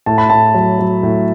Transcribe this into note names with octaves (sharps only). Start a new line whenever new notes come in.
A2 A5
B5
A2 A5
F#3
F#3
A2